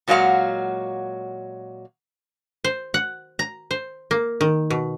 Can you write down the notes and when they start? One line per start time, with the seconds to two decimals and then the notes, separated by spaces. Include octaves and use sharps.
0.08 A#2 F#3 G#3 F#4 F5 F#5
2.64 C5
2.94 F#5
3.39 A#5
3.71 C5
4.11 A#3
4.41 D#3
4.70 B2